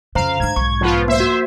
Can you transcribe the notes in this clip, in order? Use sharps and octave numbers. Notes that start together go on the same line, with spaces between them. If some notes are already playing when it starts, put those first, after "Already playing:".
F2 C#3 C5 F5 A#5
G#2 D3 G#6
B1 G#2 C#6
F3 B3 F4
A#3 C5 E5
F#4